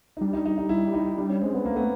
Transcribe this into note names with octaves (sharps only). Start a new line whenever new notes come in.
D#4
G3 D4
D#4
D#4
D#4
E4
D#4
G3 D4
C#4
G#3 C4
B3
A3 A#3
B3